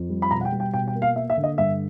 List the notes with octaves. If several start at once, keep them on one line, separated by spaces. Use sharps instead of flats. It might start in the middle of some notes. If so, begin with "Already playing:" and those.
Already playing: F2
G3
B5
B2 A#5
F#5
G5
G3
G5
B2 G5
G5
A#3
F5
A#3 E5
E5
D3
D#5
G2 E5